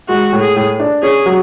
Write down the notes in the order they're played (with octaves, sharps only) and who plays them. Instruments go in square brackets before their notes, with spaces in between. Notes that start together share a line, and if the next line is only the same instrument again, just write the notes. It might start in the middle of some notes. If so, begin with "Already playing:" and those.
[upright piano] G#3 [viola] F#4
[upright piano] A2
[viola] G#4
[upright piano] A2
D4
[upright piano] C#4 [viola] G#4
[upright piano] F#3